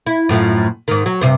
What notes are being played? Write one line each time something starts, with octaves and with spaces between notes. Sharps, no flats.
E4
F#2 A2 F3
G#2 D#3
F#3
G2 C3 C5